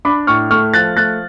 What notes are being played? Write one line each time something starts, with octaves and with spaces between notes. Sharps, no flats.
D4 B5 D6
A2 C#6 F6
A3 C#6 F6
F3 F#6 A6
A3 F#6 A6